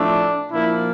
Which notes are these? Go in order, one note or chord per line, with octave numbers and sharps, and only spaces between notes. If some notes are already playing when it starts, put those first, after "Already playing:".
Already playing: A2 F3 A3 C4 D4
A#2 F3 A#3 D4 E4